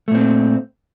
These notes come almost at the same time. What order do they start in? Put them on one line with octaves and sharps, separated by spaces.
A3 A#2 C4